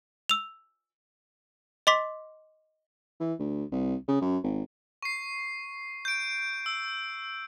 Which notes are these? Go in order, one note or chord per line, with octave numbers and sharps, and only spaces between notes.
E6 F7
D#5 C6 D6 B6
E3
D2
C2
C#3
F#2
G#1
C#6 C7
G6 D7
E6